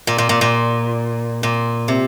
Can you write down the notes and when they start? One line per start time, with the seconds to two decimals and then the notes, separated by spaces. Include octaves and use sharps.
0.07 A#2
0.18 A#2
0.29 A#2
0.41 A#2
1.43 A#2
1.88 C3